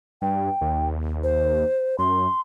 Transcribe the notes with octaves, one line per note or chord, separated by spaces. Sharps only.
G2 G5
D#2
C5
F#2 C6